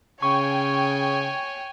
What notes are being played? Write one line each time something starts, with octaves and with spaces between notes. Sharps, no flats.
C#3 C#5 G5 G#5 C#6